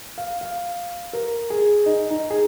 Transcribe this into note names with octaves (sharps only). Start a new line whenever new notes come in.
F5
F5
A#4
G#4
D#4
D#4
G#4